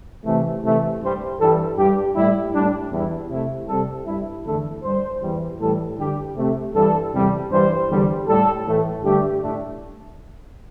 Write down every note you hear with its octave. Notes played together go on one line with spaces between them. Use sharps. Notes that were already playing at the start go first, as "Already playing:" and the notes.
C3 E3 A3
C3 E3 A3
G2 G3 C5
G2 E3 G3 A4
G2 G3 G4
A2 G3 E4
A2 G3 D4
E2 E3 G3 E4
C3 A3 E4
C3 G3 A4
G2 G3 E4
E2 D3 A3 A4
G2 G3 C5
E2 E3 G3
A2 E3 G3 A4
G2 D3 G3 G4
C3 A3
G2 E3 G3 A4
E2 C3 G3
G2 E3 G3 C5
E2 D3 G3
A2 G3 A4
A2 E3 A3
G2 D3 A3 G4
A2 A3 D4